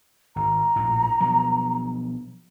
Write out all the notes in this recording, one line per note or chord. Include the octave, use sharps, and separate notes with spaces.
G#1 A#5
A#1 A2
B2 F3 F#3